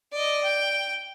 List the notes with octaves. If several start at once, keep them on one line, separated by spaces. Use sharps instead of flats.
D5 D#5
G5